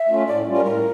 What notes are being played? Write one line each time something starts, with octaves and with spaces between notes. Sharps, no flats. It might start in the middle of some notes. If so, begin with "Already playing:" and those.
Already playing: E5
A3 C#4 F4
A2 D5
G3 C#4 F4
A#4
A2 A#4